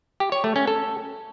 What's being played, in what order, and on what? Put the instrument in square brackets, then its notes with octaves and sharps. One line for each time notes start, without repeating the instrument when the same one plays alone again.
[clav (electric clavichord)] G4
C#5
A3
C#4
A4